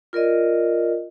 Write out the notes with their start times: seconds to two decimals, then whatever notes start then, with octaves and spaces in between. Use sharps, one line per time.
0.13 F4 A#4 D5 D#5